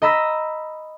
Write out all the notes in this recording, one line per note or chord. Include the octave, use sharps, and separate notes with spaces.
D#5 A#5 B5 E6 A#6 B6